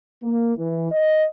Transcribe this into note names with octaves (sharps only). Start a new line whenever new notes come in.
A#3
E3
D#5